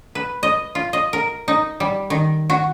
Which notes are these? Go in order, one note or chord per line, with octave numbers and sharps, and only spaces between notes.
B4
D#5
F4
D#5
A#4
D#4
G3
D#3
F#4